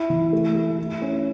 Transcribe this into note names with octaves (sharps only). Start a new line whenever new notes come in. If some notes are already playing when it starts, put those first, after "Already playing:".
Already playing: E4
E3
A3
A3
E4
C#4